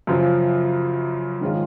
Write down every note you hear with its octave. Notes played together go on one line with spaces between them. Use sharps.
F#2 C#3 F3
G#2 D#3 G#3 C#4 F4